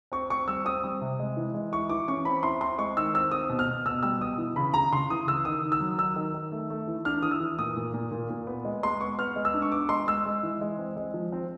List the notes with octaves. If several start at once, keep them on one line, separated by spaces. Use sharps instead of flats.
C4 C#6
C4 C#6
G3 E6
C4 D#6
G3
C3
G#3
E3
G#3
E4 C#6
E3 D6
C#4 C#6
C4 B5
E4 C6
C4 C6
G#3 C#6
D#3 E6
C4 E6
C4 D#6
B2
F6
B2
B2 E6
G3 E6
B2 D#6
E3
C#3 B5
C#3 A#5
C#3 C6
E3 D#6
C#3 E6
D#3 D#6
D#3
E6
F#3
D#3 E6
D#3
D#3
A3
A3
E3
D4 F6
E3 D#6
E6
E3
A#2 D#6
A#2
A#2
A#2
A#2
B3
G#3
G#3 C6
B3 C#6
B3 F6
G#3
E6
D4
C#6
B3 D6
G#3 C6
G#3 E6
G#3
E3
G#3
C4
G#3
F3
C4